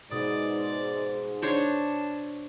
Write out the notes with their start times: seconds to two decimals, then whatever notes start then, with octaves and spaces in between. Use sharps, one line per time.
0.11 G#2 B2 D5 D#6
1.42 D4 C5 C#5 A5